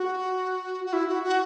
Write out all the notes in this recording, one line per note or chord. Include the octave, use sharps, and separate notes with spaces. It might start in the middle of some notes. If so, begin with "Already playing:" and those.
Already playing: F#4
F#4
E4
F#4
F#4